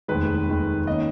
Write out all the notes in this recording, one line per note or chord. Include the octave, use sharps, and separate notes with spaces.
F1 D#2 D#3 G#3 B4
F1 D#2 D#3 G#3
D#3 A#3 C#4 D#5